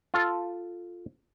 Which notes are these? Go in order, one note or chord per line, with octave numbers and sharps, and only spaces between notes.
F4 A4